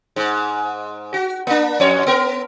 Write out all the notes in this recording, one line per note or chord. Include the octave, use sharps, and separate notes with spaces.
G#2
F#4
A#3 D4
F2 C#5
B3 A#4